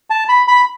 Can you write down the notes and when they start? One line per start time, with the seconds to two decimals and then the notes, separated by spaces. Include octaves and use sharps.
0.10 A5
0.29 B5
0.48 B5